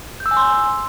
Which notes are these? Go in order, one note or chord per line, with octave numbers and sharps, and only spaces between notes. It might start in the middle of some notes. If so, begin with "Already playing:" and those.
G6
E6
G#5
C6